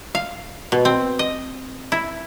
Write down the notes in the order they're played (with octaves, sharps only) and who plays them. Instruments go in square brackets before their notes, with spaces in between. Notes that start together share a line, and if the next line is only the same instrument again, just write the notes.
[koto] F5
B2
C4
D#5
E4